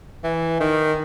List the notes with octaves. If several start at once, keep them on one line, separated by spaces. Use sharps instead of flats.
E3
D#3